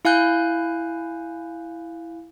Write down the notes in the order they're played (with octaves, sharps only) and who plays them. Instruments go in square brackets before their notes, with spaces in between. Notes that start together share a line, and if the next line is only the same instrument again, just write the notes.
[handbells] E4 F5 G#5 F#6 G6